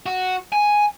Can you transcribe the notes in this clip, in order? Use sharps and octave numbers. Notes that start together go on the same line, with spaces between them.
F#4
G#5